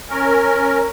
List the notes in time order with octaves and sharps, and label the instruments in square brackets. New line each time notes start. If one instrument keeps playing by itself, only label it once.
[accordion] C#4 A#4